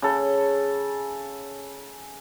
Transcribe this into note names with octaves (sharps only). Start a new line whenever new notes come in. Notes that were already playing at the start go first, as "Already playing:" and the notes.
C#3 A4